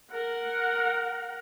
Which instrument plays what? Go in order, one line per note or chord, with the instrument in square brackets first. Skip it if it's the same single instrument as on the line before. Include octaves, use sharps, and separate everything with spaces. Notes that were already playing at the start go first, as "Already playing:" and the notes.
[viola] A#4 F#5